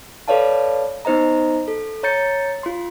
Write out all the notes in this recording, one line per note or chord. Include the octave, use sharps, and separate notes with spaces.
A4 B4 C#5 D5 F5 A5
B3 D#4 C5 D#5 A#5
A4
C#5 A#5 G6 A6 C#7
F4 C6